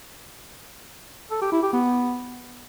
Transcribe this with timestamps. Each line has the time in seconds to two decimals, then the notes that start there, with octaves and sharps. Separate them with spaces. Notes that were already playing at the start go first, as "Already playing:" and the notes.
1.31 A4
1.41 G4
1.52 E4
1.63 G4
1.73 B3